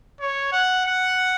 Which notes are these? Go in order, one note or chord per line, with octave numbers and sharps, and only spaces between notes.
C#5
F#5
F#5